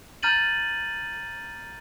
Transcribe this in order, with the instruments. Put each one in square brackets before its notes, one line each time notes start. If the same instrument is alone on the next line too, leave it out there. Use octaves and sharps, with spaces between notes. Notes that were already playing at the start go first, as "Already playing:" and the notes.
[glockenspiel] A#5 F6 G6 A6 D#7 F#7